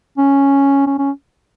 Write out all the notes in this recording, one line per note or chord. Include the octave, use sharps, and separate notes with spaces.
C#4
C#4
C#4